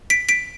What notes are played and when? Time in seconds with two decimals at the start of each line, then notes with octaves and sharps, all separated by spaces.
0.10 B6 D7
0.29 B6 D7